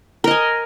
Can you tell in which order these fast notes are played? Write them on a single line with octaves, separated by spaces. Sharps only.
A#4 D#5 G#5